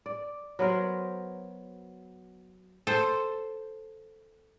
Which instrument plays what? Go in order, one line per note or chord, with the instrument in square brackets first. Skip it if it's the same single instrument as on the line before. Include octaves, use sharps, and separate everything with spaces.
[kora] D5
F#3 B3 A#4 C5
[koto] A4 C5